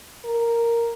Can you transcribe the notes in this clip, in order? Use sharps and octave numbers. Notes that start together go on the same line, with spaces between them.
A#4